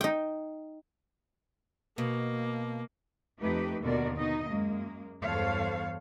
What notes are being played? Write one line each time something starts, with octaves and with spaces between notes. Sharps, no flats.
D#4 G5
B2 A#3
F2 A3 D#4 G4 B4
D#2 B2 D3 F#4 A#4 D5
B2 D#4 D#5
F#2 G#3 A#3
E2 G2 A4 C5 C#5 F5